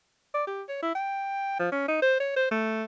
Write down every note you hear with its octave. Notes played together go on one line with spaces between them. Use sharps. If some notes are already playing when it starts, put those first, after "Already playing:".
D5
G4
C#5
E4
G5
F3
C#4
D#4
C5
C#5
C5
A3